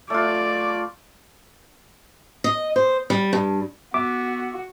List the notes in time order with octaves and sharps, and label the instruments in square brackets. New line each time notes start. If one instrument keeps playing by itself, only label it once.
[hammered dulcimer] A3 F4 [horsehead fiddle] D5
[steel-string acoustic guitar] D#5
C5
G3
G2
[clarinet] B3 [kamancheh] F#4 [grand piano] E5 [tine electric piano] D6